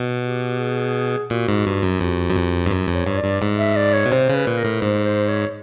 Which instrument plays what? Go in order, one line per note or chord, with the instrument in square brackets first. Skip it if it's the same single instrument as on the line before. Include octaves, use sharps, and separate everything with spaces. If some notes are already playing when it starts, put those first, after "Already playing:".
Already playing: [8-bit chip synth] B2
[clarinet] G4
G#4
[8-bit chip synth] A#2 [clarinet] F#4
[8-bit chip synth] G#2
G2
F#2
[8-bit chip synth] F2 [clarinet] F#4
[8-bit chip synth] F#2
F2
G2
F#2
F2
[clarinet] C#5
[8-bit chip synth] G2
[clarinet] D5
[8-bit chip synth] G2
G#2
[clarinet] E5
D5
C#5
[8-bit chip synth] B2
[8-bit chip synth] C3 [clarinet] C5
[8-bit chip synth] C#3
[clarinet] B4
[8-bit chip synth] A#2
[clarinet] A#4
[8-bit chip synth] A2
[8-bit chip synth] G#2 [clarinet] C5
[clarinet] C5
C#5